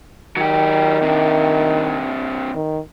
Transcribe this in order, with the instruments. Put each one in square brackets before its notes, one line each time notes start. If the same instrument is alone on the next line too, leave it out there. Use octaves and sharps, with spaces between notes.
[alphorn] D#3 [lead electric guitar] F#3 G4
[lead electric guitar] C3 D4
[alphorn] D#3